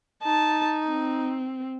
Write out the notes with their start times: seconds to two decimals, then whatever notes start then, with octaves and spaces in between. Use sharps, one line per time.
0.23 D#4 A5
0.88 C4